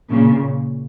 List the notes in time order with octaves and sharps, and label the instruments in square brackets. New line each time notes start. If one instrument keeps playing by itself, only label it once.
[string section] A#2 C#3